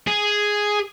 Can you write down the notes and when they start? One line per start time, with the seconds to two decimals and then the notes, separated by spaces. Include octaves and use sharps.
0.08 G#4